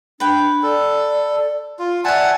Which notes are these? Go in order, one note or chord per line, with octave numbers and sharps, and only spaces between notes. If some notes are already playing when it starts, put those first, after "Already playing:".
D4 B4 G5
A4 D5
F4
C#5 D5 E5 F#5 G#5 A5